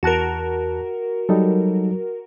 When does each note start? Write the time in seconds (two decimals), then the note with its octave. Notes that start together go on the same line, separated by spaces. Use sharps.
0.03 E2 F#4 A#4 A5 F#6
1.29 F#3 G3 D#4 A4